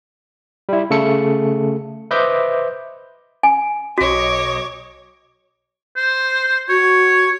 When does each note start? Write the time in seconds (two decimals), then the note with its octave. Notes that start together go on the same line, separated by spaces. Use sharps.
0.69 G3 E4
0.90 C#3 A3 A4 C#7
2.11 B4 C5 D#5 E5 D6 G6
3.43 G#5
3.98 B1 F#4 C#5 D#5 D6
5.97 C5
6.69 F#4 C#5